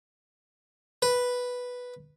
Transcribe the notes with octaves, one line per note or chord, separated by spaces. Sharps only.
B4